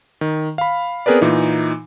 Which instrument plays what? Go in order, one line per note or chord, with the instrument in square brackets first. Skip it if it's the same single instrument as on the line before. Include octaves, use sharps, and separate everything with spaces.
[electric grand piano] D#3
F5 B5
B3 C4 G#4 A#4 B4 D5
A#2 E3 D#4